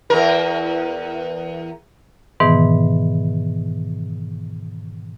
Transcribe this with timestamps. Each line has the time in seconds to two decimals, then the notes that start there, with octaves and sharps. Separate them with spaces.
0.10 E2 A#4
2.40 G#2 B2 D#3 E3 B3